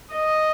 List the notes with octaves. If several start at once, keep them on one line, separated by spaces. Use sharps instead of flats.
D#5